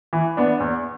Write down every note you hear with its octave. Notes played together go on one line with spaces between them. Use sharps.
E3
B3 D4
E2